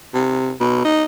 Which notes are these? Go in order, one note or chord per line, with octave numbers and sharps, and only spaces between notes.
C3
B2
D#4